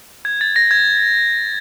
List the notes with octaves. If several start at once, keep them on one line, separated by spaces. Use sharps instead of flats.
G#6
A6
A#6
G#6